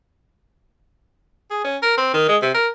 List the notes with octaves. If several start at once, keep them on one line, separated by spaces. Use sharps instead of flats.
G#4
C#4
A#4
C4
D#3
G#3
C3
A#4